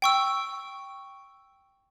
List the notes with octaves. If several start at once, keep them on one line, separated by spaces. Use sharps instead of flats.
G5 C#6 E6